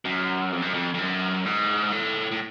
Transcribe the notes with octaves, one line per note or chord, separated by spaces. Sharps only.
F#2
F2
F#2
F2
F2
F#2
G#2
A2
A2